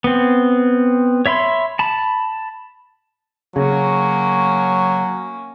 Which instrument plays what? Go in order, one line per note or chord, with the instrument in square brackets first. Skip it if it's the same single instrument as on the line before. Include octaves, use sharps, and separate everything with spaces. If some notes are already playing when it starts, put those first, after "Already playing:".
[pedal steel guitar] B3 C4
C#5 E5 B5 C6
A5 B5
[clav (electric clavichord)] C#3 [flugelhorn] F#3 [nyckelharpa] A#3 C#4